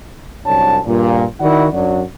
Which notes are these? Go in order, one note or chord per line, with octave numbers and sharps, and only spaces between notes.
C2 F#2 D4 C#5 A5
G2 A#2
D#3 E4 F#4 D5 F#5
F#2 F#3 D4 F#4 D5